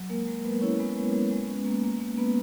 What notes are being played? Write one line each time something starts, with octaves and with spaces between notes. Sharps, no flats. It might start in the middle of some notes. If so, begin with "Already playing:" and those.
Already playing: F#3
G#3 A#3 A#4
G#3 A#3 A#4
G#3 B3 B4
C#4 E4 C#5
G#3 B3 B4
G#3
G#3
G#3
C#4
A#3
A#3
A#3
A#3 B3 B4